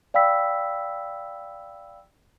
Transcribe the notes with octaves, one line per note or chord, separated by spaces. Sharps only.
D5 F5 G5 B5 E6 B6